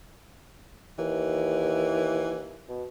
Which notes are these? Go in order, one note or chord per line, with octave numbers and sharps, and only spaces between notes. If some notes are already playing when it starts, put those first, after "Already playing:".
D#2 E3
B2